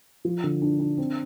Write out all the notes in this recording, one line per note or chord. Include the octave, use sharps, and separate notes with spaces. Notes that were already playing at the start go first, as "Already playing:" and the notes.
F3
D3
D4
D4
C4